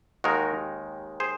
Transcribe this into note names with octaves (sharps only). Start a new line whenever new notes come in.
D#2 D#3 G#3 D#4 F#4 A#4
G#4 C5